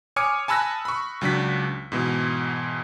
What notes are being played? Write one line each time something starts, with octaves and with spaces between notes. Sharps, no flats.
C#5 G#5 D6 D#6 F6 C#7
G#5 A5 B5 E6 F#6 A#6
B5 C#6
C#2 F#3 D4 B6
G#2 B2 E3